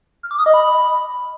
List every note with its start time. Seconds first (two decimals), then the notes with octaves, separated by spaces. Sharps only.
0.23 F6
0.31 D6
0.38 D#6
0.46 D#5
0.54 B5